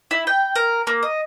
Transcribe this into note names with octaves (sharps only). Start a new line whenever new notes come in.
E4
G5
A#4
A#3
D#5